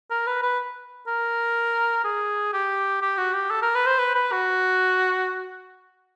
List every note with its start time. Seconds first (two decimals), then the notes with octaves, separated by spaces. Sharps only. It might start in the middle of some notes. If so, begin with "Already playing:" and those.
0.10 A#4
0.27 B4
0.42 B4
1.07 A#4
2.04 G#4
2.53 G4
3.02 G4
3.18 F#4
3.34 G4
3.51 A4
3.62 A#4
3.75 B4
3.87 C5
3.99 B4
4.15 B4
4.32 F#4